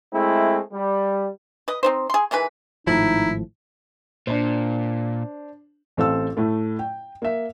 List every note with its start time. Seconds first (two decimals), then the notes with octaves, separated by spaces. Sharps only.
0.13 G#3 A3 C4 E4
0.72 G3
1.68 B4 D#5
1.83 C4 D#4 C5
2.10 G#4 C6
2.31 D#3 E3 G#3 B4
2.87 G#1 A2 F3 D#4 E4
4.27 A#2 D4 C5
5.97 A1 C4 A4 F5 E6
6.37 A2 A3
6.79 G5
7.22 A#3 E5